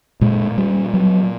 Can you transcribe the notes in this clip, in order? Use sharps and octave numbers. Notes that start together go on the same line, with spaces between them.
A#2 G#3
G3
F#3